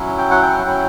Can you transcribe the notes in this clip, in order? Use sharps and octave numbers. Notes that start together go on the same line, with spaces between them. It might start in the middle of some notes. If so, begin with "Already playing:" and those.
Already playing: F#3 C#4 E4
G5
F#5
G5
F#3 C#4 E4 G5